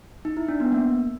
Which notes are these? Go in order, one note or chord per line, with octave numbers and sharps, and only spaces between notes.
D#4
E4
D4
B3
A#3